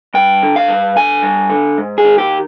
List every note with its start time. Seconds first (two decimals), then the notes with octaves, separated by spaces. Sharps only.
0.14 G2 G5
0.43 D3
0.56 F5
0.68 G2
0.96 D3 G#5
1.23 G2
1.50 D3
1.78 G#2
1.98 G#4
2.04 D#3
2.18 G4